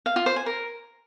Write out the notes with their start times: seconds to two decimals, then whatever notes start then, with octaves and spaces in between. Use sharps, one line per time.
0.06 F5
0.16 F4
0.26 C5
0.36 G#5
0.46 A#4